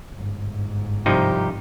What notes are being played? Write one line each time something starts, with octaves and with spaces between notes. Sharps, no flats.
G1 G#2
C2 F3 D#4 G4